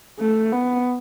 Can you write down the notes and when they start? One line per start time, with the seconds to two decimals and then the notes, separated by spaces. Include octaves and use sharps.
0.20 A3
0.52 B3